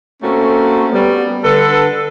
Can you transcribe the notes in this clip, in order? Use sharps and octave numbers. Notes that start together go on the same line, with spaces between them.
A3 A#3 C4 C#4 F#4 A4
G3 B3
D3 A4 B4